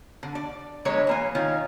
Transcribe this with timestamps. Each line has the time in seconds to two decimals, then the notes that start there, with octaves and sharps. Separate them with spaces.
0.23 D3
0.35 D5
0.85 D3 F#3 G#3 B4 C#5
1.07 E3 A#3 G#5
1.35 D#3 C#4 F4